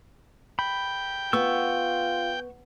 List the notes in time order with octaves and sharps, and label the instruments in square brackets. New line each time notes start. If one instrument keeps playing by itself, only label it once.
[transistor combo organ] G5 [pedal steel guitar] B5
[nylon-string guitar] B3 [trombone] F4 [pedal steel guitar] C#6 E6